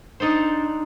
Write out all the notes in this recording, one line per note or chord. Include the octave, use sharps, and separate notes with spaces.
D4 D#4 A4 C5